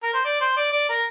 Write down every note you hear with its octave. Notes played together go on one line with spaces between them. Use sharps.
A#4
C5
D5
C5
D5
D5
A#4